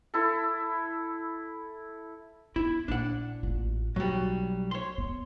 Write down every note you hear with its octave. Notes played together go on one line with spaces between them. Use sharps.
E4 A4
B3 E4
A#1 D4 F#5
A1 F4
B1 F#3 G3
C#5 C6
B3